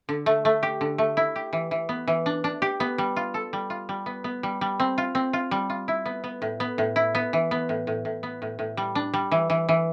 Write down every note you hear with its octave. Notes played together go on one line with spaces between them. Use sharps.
D3
A3
A3
G4
D3
A3
E4
G4
E3
E3
B3
E3
D4
D4
G4
B3
G3
F4
A4
G3
F4
G3
B3
B3
G3
G3
C4
F4
C4
F4
G3
F4
E4
B3
B3
A2
B3
A2
E4
B3
E3
B3
A2
A2
A2
B3
A2
A2
G3
D4
G3
E3
E3
E3